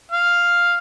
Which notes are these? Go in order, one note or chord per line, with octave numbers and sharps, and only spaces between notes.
F5